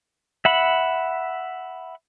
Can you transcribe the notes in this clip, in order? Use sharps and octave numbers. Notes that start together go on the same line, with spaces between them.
E5 F#5 B5